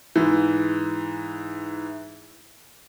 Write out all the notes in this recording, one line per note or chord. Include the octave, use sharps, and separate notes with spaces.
G#2 E3